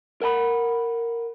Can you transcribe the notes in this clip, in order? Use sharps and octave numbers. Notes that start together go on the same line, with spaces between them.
A#4 F#5 A5 B5